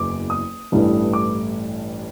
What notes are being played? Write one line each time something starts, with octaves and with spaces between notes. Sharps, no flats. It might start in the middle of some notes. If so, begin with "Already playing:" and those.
Already playing: F#1 E2 D6
D#6
A1 G2 E3 A3
D6